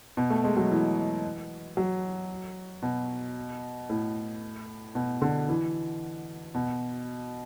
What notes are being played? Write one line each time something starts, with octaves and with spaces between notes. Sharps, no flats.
B2
A3
G#3
F#3
E3
F#3
B2
A2
B2
D3
E3
B2